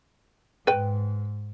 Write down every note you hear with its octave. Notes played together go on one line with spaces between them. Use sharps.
G#2 B4 G5